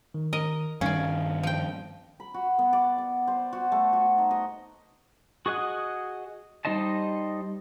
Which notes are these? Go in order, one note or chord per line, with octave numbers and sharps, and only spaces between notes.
D#3
A#4 D#5
G2 D#3 C#4 D5 F5
F3 G5
B5
F#4
B3
D5
D5
C5
F#4
A3
F#4
D#4
D#5
F#4 G#4 D#5 F#5
G3 D#4 C5 D#5 A5